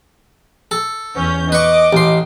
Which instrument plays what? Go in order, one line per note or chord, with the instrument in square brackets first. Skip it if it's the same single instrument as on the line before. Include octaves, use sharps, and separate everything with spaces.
[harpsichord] A4
[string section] E2 C#4 G6
[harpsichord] B4 C#6 [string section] D#5 D6
[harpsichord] A1 C6